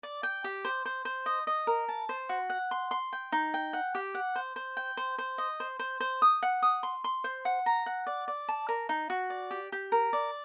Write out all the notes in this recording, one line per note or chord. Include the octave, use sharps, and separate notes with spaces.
D5
G5
G4
C5
C5
C5
D#5
D#5
A#4
A5
C5
F#4
F#5
C6
C6
G5
D#4
G5
F#5
G4
F#5
C5
C5
G5
C5
C5
D#5
C5
C5
C5
D#6
F#5
D#6
C6
C6
C5
F#5
A#5
F#5
D5
D5
A5
A#4
D#4
F#4
D5
G4
G4
A#4
D5